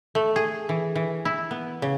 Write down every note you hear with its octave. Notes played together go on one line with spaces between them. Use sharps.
A3
G#4
E3
E3
E4
B3
C#3